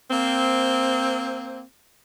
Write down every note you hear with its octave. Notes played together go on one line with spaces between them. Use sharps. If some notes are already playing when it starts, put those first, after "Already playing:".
A#3 C4